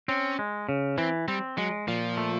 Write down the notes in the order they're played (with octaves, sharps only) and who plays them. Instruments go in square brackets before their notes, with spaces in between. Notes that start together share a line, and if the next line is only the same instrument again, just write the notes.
[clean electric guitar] C4 [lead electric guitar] C#4
[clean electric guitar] G#3
C#3
[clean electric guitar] E3 [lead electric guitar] C4
[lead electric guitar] G3 [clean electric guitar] C4
[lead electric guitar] F#3 [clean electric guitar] G#3
[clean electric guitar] A#2 [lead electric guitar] F3
[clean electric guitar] A3